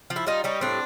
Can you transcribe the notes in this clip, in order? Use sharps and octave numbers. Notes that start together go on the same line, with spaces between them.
F3
E4
G3 D#4 F4
G3 C#4 D#4
A2 C4 D4